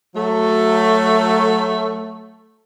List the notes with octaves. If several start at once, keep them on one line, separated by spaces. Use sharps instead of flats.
F#3 A3